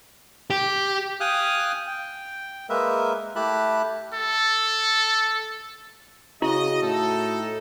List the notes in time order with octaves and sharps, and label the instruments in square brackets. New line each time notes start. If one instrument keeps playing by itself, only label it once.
[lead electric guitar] G4
[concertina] F5 G5 G#5 D#6 F6 F#6
G5
G#3 A#3 A#4 B4 E5
A3 E4 G4 A5 B5 F#6
[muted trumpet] A4
[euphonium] C#3 [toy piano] E4 [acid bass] F#4 [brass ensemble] D#5
[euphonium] A2 [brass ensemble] D#4 A4